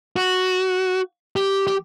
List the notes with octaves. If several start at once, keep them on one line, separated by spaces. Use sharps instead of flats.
F#4
G4
G4